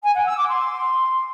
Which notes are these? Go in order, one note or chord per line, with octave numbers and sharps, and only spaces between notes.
G#5
F#5
E6
D6
C6